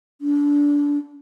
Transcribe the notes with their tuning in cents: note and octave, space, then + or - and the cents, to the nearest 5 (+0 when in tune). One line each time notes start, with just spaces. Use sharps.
D4 -25